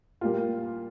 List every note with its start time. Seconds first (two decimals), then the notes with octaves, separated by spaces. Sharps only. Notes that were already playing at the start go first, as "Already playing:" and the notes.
0.21 A#2 G3 A#3 F4